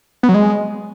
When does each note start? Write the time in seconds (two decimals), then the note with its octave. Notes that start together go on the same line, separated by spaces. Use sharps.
0.23 B3
0.29 F#3
0.34 G#3